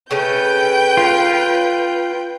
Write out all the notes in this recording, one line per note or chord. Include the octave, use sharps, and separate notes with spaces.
C#3 A3 C#4 B4 G5 G6
F4